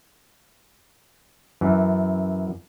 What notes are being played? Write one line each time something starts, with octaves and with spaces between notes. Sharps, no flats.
F#2 E3